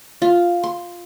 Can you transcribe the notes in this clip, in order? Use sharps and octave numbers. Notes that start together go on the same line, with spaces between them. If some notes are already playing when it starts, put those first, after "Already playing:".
F4
C6